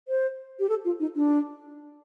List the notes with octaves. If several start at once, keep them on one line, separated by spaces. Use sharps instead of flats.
C5
G4
A4
F4
D#4
D4